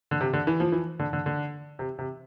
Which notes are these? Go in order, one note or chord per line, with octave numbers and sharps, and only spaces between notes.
D3
C3
D3
E3
F3
E3
D3
D3
D3
C3
C3